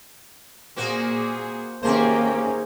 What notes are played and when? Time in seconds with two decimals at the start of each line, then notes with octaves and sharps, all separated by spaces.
0.76 A#2 A#3 C4 F#4 G#4
1.83 D#3 A#3 C#4 G4 G#4 C5